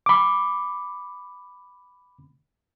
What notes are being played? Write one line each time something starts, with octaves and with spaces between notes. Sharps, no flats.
B5 D6